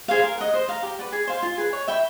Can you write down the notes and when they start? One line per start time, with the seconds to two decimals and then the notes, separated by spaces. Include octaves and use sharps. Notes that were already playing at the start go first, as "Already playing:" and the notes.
0.08 G#4 C5 F5
0.24 A#4
0.38 D#5 F#5
0.54 C5
0.69 F5 A#5
0.83 G4
0.99 B4 D5 F#5
1.12 G#4
1.27 C5 F5 G#5
1.43 F4
1.58 G#4 B4
1.73 C#5
1.87 E5 G5 B5